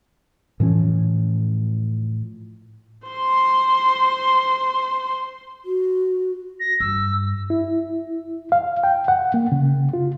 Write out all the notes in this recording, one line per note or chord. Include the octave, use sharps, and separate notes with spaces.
A2 E3 F3 C#4
C5 C6
F#4
A#6
G2 E6
E4
F5
G5
F#5
A#3
C#3
F4